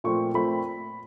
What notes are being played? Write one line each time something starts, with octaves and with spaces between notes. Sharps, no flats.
A#2 F3 A3 C4 C#6
A#2 F3 A3 C4 B5